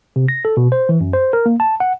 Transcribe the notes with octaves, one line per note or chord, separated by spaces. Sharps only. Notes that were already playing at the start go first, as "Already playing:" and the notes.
C3
A#6
A4
B2
C5
E3
F#2
C5
A#4
A#3
A5
F#5